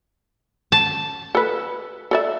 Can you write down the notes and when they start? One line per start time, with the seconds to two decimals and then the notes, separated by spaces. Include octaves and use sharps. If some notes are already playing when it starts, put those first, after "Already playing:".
0.72 A5
1.35 A4 B4
2.11 A4 D5 E5